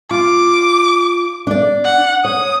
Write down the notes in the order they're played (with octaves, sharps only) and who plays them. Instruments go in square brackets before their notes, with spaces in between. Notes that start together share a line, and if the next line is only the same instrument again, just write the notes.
[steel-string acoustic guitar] F4 [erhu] D6
[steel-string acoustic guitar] D4 D5
[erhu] F#5
[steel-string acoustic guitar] C#5 [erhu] D#6